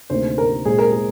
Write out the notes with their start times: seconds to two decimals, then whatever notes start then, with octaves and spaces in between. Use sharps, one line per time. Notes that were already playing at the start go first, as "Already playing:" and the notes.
0.10 D2 C3 D#3 A#3 C5
0.38 A#4
0.65 A#2 G#3 C4 G#4
0.78 A#4
0.92 G#4